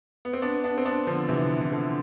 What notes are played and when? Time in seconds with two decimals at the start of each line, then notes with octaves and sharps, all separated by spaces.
0.25 B3
0.33 C4
0.42 B3 D4
0.64 B3 D4
0.78 C4
0.85 B3 D4
1.07 D3 F3
1.29 C3 E3
1.61 E3
1.72 D3 F3